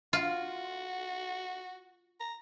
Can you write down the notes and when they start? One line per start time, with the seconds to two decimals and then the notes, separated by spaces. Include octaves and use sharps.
0.13 F4 F#4
2.20 A#5